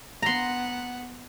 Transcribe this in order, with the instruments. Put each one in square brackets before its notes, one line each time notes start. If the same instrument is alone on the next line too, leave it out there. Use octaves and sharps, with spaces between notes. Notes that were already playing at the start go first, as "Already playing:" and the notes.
[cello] B3 F#5 [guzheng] A#5 C6